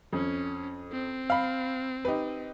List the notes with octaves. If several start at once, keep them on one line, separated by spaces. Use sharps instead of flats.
F2 C#4
C4
F5 B5
D#4 G4 B4